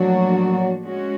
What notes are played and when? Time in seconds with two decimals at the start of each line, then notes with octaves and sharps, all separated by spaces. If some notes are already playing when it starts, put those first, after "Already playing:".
Already playing: A2 F3 F#3 A#3 D4 F#4
0.83 G#3 C#4 F#4